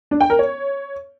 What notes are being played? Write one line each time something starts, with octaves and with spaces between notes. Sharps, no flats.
D4
G5
A#4
C#5